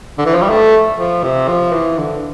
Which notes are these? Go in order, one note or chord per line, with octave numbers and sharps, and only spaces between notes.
D3
E3
F3
G3
A3
F3
C3
F3
E3
D3